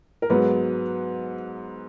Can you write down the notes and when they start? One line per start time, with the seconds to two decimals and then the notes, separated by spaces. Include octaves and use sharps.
0.22 A#4
0.30 G#2 F#3 B3 B4